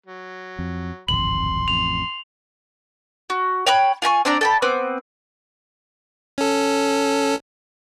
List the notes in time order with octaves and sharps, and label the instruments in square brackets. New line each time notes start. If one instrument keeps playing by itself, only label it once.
[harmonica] F#3
[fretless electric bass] F2
[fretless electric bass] D1 G#1 F2 [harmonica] C6 [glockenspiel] F#7
[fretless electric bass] A1 F2 [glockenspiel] F7
[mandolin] F#4
C#5 G5 B5 F#6
F4 G#5 A#5 C#6
C4 D4 D5 A#5
A4 G5 B5
B3 C4 D6
[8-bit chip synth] C#4 A4